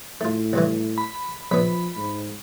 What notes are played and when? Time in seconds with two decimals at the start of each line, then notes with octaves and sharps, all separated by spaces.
0.21 A2 A3 F4
0.53 D2 G2 E3
0.98 B5
1.51 A#1 F3 B3 B5
1.97 G#2